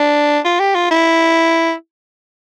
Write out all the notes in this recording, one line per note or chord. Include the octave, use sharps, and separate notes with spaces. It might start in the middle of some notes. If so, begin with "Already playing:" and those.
Already playing: D4
F4
G4
F4
E4